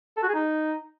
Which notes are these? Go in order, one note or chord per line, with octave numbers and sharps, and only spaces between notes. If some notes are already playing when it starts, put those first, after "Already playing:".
A4
F#4
G#4
D#4